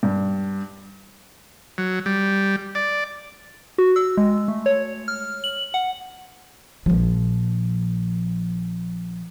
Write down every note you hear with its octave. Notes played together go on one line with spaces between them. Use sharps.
G2
F#3
G3
D5
F#4
E6
G#3
A3
C#5
F6
F#7
F#5
A#1 F3